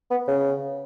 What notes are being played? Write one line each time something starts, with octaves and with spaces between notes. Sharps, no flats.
B3
C#3